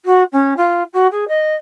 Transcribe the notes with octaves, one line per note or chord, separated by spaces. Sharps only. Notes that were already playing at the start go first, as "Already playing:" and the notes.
F#4
C#4
F4
F#4
G#4
D#5